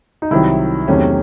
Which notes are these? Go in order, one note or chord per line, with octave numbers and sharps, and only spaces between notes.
D#4
C2 C3 D#3 F#3 E4
E2 C3 D#3 F#3 A3 C#4